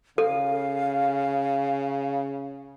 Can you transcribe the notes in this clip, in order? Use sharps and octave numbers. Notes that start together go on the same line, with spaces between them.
C#3 A4 F5